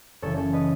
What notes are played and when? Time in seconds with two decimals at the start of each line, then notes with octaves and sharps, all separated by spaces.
0.22 F#1 F#2 C#3 E3 A4 C#5
0.37 A4 C#5
0.53 B4 D#5